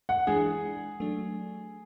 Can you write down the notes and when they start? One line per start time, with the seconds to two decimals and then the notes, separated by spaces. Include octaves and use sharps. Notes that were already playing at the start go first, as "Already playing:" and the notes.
0.09 F#5
0.27 E3 G#3 D4 G#4
1.00 F#3 A3 D4